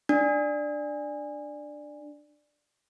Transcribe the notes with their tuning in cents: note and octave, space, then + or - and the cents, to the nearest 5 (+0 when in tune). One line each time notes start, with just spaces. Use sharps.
D4 +10